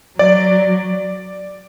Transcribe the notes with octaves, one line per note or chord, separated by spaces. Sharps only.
F#3 D5